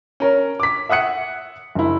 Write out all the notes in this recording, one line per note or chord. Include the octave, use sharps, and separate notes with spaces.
C#4 A#4 C#5
D6 B6
E5 F#5 D#6 F#6 C#7
F#1 E4